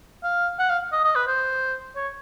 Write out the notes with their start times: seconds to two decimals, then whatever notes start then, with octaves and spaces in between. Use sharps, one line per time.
0.23 F5
0.59 F#5
0.70 F5
0.92 D#5
1.04 D#5
1.15 B4
1.27 C5
1.96 C#5